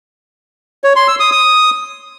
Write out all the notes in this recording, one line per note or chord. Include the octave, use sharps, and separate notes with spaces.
C#5
C6
E6
D#6
D#6